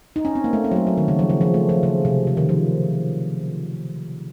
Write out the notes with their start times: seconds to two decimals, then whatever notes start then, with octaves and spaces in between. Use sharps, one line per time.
0.16 D#4
0.25 C#4
0.35 C4
0.44 A#3
0.53 A3
0.64 C4
0.72 F#3
0.76 A3
0.87 F#3
0.98 D#3
1.08 C#3
1.19 F3
1.30 C#3
1.41 F3
1.54 A3
1.69 F3
1.83 C#3
2.05 C3
2.27 C#3
2.37 D#3
2.49 F3